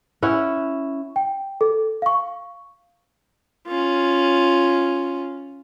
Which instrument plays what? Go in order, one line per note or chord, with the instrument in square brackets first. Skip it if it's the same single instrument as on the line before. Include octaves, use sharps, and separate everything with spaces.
[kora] C#4 E4 F#5
[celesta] G5
A4
F5 C#6
[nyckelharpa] C#4 F4